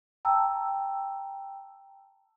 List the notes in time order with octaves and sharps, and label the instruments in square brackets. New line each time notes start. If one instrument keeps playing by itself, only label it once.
[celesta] G5 A5 A#5 E6